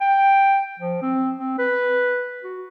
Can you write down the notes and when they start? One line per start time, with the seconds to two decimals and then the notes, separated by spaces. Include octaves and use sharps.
0.01 G5
0.80 F3
1.02 C4
1.37 C4
1.59 B4
2.43 F#4